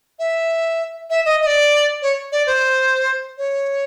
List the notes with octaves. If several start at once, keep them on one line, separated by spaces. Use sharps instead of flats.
E5
E5
D#5
D#5
D5
C#5
D5
C5
C#5